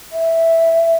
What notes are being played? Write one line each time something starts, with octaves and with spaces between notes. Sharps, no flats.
E5